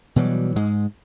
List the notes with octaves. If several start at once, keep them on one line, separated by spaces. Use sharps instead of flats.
B2 E3 F#3 G3
G#2 G#3